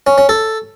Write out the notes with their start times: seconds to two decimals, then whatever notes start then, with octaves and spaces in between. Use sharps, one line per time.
0.07 C#4
0.18 C#4
0.29 A4